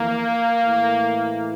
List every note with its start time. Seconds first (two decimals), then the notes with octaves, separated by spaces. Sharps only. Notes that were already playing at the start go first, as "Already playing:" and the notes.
Already playing: F2 E3 A#3
0.62 A2 E3